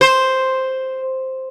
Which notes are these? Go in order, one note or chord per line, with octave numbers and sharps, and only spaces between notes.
C5